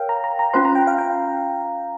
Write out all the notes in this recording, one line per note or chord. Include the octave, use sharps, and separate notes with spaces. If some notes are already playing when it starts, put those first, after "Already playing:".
Already playing: A#4 C#5 F5 G5
A#5
A#5
A#5
C#4 F4 C5 C6
A#5
G5
F5
G5